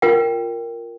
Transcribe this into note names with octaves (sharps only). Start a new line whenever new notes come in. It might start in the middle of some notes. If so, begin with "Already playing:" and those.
F4 A#4 G5